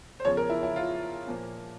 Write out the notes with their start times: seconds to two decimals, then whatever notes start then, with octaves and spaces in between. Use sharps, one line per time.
0.20 C5
0.25 E2 C#3 F3 C#5
0.37 A#4
0.50 E4
0.63 E4
0.76 F4
1.27 A#2 F3 A#3